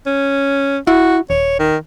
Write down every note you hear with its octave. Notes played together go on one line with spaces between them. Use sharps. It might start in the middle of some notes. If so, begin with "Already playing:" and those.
C#4
E4 F#4
D#1 C#5
D#3